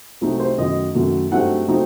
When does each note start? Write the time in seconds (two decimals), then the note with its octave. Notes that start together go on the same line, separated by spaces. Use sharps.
0.21 C2 C3 F#3 A3 D#4
0.40 C5
0.57 F#2 D#3 F#3 A3 D#5
0.95 F#2 D#3 F#3 A3
1.31 G2 F#3 A3 C4 D#4 F#5
1.68 F#3 A3 C4 D#4